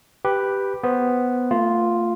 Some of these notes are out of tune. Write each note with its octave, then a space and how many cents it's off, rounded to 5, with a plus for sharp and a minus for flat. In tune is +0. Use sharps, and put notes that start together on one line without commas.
G4 +0 B4 +0
B3 +0 C5 +0
A3 +35 F4 +0